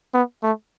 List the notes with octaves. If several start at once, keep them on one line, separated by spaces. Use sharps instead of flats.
B3
A3